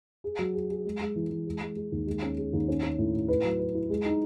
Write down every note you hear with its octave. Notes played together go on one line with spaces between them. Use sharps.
G#4
F#3
G#4
G#4
G#3
G#3
E3
E3
G#3
G#3
G#3
D#2
G#3
C#4
G#3
D#2
C#4
C#4
A2
A2
B4
F#3
B4
E4
G#3
D#4